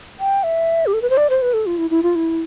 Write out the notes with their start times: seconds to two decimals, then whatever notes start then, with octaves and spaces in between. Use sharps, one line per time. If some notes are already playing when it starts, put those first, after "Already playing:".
0.19 G5
0.43 E5
0.86 G4
0.94 A4
1.02 B4
1.10 C5
1.17 D5
1.30 C5
1.42 B4
1.54 A4
1.66 F4
1.78 E4
1.90 E4
2.03 F4
2.15 E4